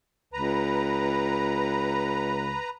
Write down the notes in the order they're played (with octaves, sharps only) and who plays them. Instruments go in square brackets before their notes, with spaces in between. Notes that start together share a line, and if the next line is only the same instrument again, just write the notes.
[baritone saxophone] C#2 [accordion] B4 A#5